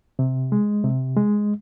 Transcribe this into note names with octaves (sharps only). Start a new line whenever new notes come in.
C3
G#3
C3
G#3